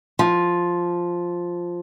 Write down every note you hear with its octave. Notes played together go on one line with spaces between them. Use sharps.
F3